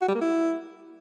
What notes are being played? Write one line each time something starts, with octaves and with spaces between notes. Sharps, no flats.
F#4
G3
A#3
E4